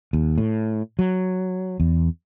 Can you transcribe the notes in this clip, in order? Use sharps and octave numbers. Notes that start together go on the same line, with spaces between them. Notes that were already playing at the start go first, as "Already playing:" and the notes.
D#2
A2
F#3
E2